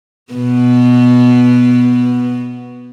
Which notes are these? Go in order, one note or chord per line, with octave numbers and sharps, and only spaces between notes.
B2 B3